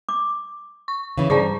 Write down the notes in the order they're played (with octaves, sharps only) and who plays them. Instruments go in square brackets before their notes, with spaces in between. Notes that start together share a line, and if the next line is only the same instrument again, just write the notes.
[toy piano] D6
[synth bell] C#6
[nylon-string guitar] C#3 E3
[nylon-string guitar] G2 [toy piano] G#4 A5 A#5 [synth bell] C5 D5 C#6